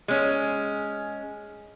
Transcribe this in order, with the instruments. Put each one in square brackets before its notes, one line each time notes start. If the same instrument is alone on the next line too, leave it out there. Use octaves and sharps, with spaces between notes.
[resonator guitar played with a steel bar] G#3 C#4